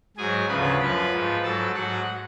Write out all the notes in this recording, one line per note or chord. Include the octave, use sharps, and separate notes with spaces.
G#2 F#3 G#4 G#5
D2 C#3 F3 B4 B5
F#2 F3 B4 B5
G#2 F3
G#2 F#3 A4 A5
G#2 F#3 F#4 F#5